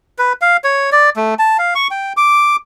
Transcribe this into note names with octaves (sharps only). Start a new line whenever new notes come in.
B4
F5
C#5
D5
A3
A5
F5
C#6
G5
D6